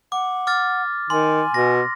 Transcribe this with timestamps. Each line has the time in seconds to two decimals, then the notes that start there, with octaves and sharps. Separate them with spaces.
0.12 F#5 D6
0.47 D6 F6 A6
1.10 D#3 G#5 C6
1.54 B2 A#6